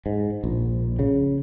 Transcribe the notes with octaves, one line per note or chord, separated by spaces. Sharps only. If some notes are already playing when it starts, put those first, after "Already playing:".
G#2
A#1
C#3